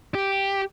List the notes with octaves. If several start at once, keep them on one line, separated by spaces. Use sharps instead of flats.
G4